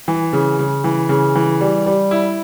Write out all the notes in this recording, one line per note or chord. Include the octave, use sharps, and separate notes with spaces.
E3
C#3
C#3
E3
C#3
E3
G3
G3
E4